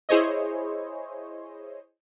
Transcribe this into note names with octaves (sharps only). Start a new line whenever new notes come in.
E4 G#4 C5 C#5 D#5